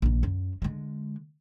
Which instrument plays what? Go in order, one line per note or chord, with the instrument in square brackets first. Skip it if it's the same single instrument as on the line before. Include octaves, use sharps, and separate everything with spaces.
[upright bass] A#1 D#3
F#2
D3 G#3